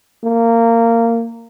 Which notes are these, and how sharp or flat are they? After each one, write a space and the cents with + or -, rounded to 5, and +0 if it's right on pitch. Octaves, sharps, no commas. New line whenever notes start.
A#3 -20